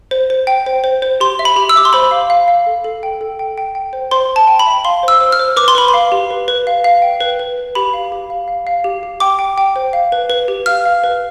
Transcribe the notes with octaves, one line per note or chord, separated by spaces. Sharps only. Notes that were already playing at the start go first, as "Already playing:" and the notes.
C5
C5
G5
C5
C5
C5
G4 C6
E5
B5
G4
E6
E5 D6
C6
C5 B5
F5
F5
F5
A4
A4
G5
A4
G5
G5
G5
C5
C5 C6
C5
A5
G5
B5
E5
F5 C6
C5 E6
C5
F6
C5
B4 D6
C6
B4 B5
C6
F5
G4
B4
B4
F5
F5
G5
B4
B4
B4
G4 B5
F5
G4
F5
F5
F5
G4
G4
G5 D6
G5
G5
C5
F5
B4
B4
G4
F5 F6
F5
B4